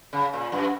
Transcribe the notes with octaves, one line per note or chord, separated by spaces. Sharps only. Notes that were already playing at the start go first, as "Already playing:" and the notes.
C#3
A#2
F#2